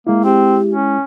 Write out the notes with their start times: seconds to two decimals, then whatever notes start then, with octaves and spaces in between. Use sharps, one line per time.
0.07 G#3 A#3 E4
0.24 C4 G4
0.71 C#4